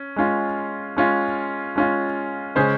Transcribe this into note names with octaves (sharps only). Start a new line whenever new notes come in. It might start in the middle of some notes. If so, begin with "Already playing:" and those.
Already playing: C#4
G#3 C#4 F4
G#3 C#4 F4
G#3 C#4 F4
C#3 G#3 C#4 G#4 C5